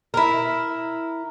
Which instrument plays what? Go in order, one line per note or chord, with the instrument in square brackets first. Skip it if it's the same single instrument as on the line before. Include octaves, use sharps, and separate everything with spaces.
[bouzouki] E4 A#4